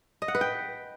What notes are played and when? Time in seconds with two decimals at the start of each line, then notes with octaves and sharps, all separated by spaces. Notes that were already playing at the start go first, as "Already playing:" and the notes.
0.22 D#5
0.28 F#5
0.35 B4
0.41 G5